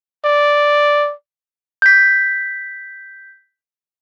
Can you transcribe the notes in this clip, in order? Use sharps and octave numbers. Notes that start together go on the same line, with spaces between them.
D5
G6 B6